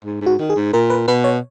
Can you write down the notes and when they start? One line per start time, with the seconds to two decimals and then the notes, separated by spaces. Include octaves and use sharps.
0.04 G#2
0.21 G#2
0.26 F#4
0.39 D#3
0.50 G#4
0.56 G#2
0.73 A#2 A#4
0.90 B4
1.08 B2 B4
1.24 C#5